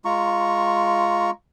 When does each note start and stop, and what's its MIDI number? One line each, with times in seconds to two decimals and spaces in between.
0.05 1.31 56
0.05 1.31 65
0.05 1.31 82
0.05 1.31 85